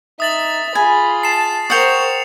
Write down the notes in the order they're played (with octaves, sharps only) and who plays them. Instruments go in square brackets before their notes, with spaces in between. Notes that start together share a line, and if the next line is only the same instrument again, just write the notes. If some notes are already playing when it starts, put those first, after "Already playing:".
[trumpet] D#4 [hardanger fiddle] E5 [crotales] D#6 A6 F#7
[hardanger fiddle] F4 G#4 [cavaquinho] G#5 [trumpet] B5
[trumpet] A5 [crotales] C7 E7
[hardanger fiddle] A#4 C5 [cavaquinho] F#5 G5 [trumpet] C#6 [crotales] D#6 C#7 F7